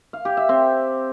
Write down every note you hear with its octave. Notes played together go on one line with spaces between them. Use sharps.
F5
G4
E5
C4